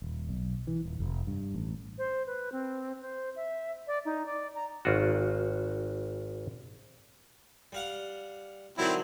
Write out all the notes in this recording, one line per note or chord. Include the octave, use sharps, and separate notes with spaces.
D#1
B1
E3
D#1
F1
G2
A1
C5
B4
C4
C5
E5
D5
D#4
D5
A#5
G#1 F4 F#4
G3 F5 F#5
D3 D#3 F#3 C4 E4